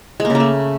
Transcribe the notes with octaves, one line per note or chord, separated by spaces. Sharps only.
G#3
A#3
C#3
A#3
A3